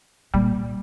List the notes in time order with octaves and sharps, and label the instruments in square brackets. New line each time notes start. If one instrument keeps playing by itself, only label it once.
[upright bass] A#2 [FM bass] G3